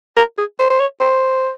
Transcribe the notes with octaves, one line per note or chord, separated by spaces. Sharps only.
A#4
G#4
C5
C5
C#5
C5